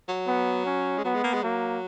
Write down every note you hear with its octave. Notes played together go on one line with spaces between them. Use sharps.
F#3
B3
C#4
G#3
F#3 B3
G#3
A#3
G#3
F#3 A#3